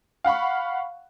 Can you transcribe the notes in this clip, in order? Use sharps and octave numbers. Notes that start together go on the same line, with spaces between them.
F5 F#5 B5 C#6